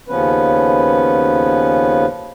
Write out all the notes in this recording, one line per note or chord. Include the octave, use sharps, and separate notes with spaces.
D#2 C#3 F3 B3 C#4 B4